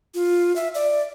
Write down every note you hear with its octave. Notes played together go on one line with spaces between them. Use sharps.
F4
E5
D5